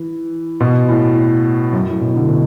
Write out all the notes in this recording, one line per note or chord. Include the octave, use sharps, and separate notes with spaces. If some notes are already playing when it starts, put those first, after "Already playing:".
Already playing: E3
B2
A2
F#2
A2
B2
D3
B2